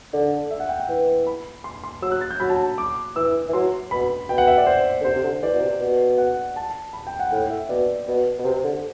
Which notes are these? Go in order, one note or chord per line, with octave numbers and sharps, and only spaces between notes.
D3 D5
E5
F#5
G5
G5
E3
B5
C6
C6
F#3 E6
F#6
A6
G6
F#3 B5
A5
D6
E3 E6
E3
F#3 C6
B2 B5
B2 G5
F#5
E5
D5
C5
D3
C3 C5
C3
D3
E3 D5
B2
C3
B2
F#5
A5
B5
G5
F#5
A2 G5
E5
B2 D5
B2
B2
C3 C5
D3